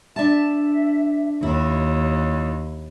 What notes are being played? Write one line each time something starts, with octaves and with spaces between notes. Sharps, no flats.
D4 E5 A5
D#2 E4 C#5